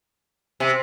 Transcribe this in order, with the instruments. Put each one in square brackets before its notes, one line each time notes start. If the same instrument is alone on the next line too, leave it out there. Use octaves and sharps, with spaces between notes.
[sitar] C3